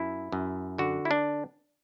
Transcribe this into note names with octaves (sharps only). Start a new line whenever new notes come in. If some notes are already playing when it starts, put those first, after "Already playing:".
Already playing: F#2 E4
F#2
D3 F#4
E4
D4